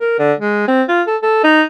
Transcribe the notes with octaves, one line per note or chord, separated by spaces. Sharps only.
A#4
D3
G#3
C4
F4
A4
A4
D#4